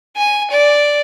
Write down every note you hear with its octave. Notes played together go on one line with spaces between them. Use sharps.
G#5
D5